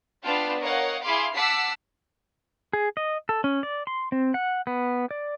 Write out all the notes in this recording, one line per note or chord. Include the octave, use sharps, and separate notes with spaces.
B3 D4 F4 F5 G5 A5
A#4 C#5 D#5 F5 F#5
E4 G#4 F5 B5 C6 D6
F#5 A5 D6 E6 B6 C7
G#4
D#5
A4
C#4
D5
C6
C4
F#5
B3
D5